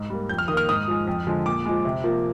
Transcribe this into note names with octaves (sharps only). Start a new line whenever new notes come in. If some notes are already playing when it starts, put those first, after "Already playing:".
Already playing: G#2
G3 A#3
F2 G6
F6
D#3 D#6
A#3 F6
G#2 D#6
F3 G#3
F2
D3 F3 G#3
A#2 D6
F3 G#3
C3
F3 A#3